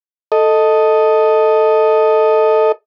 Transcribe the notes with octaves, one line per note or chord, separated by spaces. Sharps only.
A4 D#5